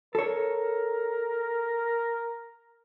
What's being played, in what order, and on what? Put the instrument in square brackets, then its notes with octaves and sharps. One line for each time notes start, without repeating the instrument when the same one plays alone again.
[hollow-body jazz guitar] A4 C#5 [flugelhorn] A#4